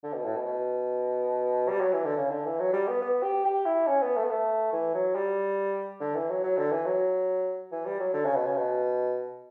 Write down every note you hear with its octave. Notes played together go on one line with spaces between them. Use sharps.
D3
B2
A2
B2
B2
G3
F#3
E3
D3
C#3
D3
E3
F#3
G3
B3
B3
G4
G4
E4
C#4
B3
A3
B3
A3
E3
F#3
G3
D3
E3
F#3
F#3
D3
E3
F#3
E3
G3
F#3
D3
C#3
B2
C#3
B2